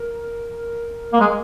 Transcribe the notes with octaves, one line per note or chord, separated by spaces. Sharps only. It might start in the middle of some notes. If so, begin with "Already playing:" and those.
Already playing: A#4
A#3
G#3